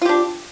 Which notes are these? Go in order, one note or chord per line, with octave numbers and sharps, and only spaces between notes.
D4 F4 G4